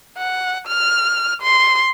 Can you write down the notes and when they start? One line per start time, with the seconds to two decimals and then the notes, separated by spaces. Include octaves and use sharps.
0.18 F#5
0.68 F6
1.42 C6